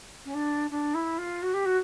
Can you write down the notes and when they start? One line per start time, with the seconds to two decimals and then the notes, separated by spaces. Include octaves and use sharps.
0.25 C#4
0.34 D4
0.70 D4
0.94 E4
1.18 F4
1.42 F#4
1.53 G4
1.65 F#4